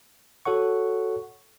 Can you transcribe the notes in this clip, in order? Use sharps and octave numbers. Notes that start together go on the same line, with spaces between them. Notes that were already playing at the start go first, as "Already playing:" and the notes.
F#4 A4 C#5 F#5 C#6